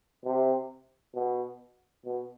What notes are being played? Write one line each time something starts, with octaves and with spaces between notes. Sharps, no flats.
C3
B2
B2